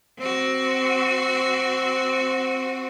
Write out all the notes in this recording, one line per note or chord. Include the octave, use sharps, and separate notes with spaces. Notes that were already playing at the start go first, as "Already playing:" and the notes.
C4 F#4